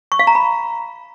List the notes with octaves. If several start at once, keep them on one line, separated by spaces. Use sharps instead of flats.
C#6
F5
A#5
B5